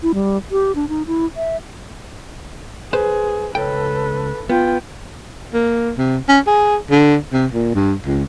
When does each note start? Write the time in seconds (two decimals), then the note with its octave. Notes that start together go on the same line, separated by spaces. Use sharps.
0.03 E4
0.14 G3
0.51 G4
0.75 D4
0.89 D#4
1.07 E4
1.37 E5
2.93 G#4 B4 C5
3.55 C#2 A4 B4 G5
4.50 B3 F4 G5
5.54 A#3
5.98 C3
6.29 C#4
6.47 G#4
6.91 D3
7.33 C3
7.52 A#2
7.75 G2
8.06 C#2